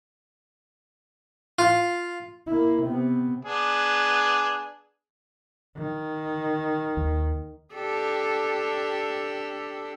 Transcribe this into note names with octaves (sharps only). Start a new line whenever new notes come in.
F4
A#3 E4
C3 B3
B3 D4 G#4
D#3
D#2
D4 G4 A4